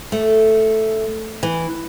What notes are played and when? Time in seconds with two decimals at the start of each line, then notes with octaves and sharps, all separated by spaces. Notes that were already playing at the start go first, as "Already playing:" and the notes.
0.12 A3
1.43 E3